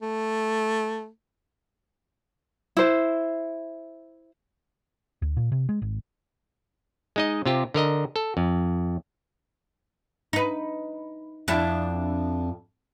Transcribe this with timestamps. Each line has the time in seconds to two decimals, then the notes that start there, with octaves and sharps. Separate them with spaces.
0.02 A3
2.77 E4 C5
5.22 D2
5.37 A#2
5.52 C3
5.69 G#3
5.82 G#1
7.16 G#3 D#4 D#5
7.45 C3 F4 G4
7.74 D3 A#4 D#5 A#5
8.16 A4
8.37 F2
10.33 D#4 B4
11.48 F2 D4 E4